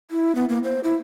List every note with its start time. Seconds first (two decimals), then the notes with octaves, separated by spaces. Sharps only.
0.11 E4
0.35 B3
0.49 A#3
0.64 C5
0.84 E4